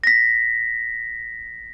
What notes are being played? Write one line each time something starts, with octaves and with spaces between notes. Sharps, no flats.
A#6 B6